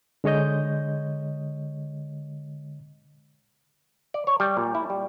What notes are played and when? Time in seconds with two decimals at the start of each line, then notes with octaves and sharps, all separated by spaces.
0.24 D3 G#3 C#5 D#5 G6
4.14 D5
4.27 C#5
4.40 G3
4.57 A#2
4.75 E4
4.90 G3